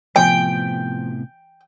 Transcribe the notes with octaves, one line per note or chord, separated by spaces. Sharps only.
A2 C3 F3 B3 G5 G#5